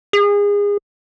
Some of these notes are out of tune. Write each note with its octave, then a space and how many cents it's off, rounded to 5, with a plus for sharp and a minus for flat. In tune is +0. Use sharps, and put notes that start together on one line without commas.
G#4 -30